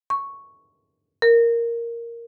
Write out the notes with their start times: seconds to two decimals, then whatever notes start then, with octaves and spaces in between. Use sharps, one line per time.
0.10 C#6
1.22 A#4